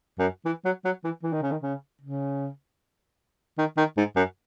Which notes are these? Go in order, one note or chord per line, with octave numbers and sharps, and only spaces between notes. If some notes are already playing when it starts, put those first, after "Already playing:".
F#2
E3
F#3
F#3
E3
E3
D#3
C#3
D#3
C#3
C#3
D#3
D#3
G#2
F#2